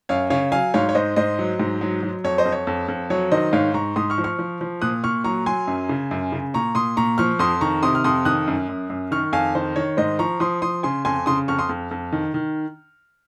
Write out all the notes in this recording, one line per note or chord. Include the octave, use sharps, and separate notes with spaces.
F#2 C#5 F5
C#3 C#5 F5
F#3 F5 G#5
G#2 C#5 F5
C#5
G#2 C5 D#5
G#2 C5 D#5
F#3
G#2
F#3
F#3
F2 C#5
C5 D#5
F2
C#5
F2
F2
F#3 C#5
D#3 C5 D#5
G#2 C#5 F5
G#2 A#5 C#6
G#2 C6 D#6
C#6 F6
F3
C#6 F6
F3
F3
A#2 D#6 F#6
A#2 C#6 F6
F#3 A#5 C#6
F#3 G#5 C6
F#2
C#3
F#2
C#3
A#2 A#5 C#6
A#2 C6 D#6
A#2 A#5 C#6
F3 C#6 F6
F2 C6 D#6
D#3 A#5 C#6
C3 C6 D#6
F6
F2 C6 D#6
D#3 D#6 F#6
F#2
F#2
F#2
D#3 C#6 F6
F2 F5 G#5
D#3 C5
D#3 C#5
G#2 C5 D#5
F3 A#5 C#6
F3 C6 D#6
F3 C6 D#6
C#3 G#5 C6
F2 G#5 C6
C#3 C6 D#6
F2 C#6 F6
C6 D#6
F2
F2
D#3
D#3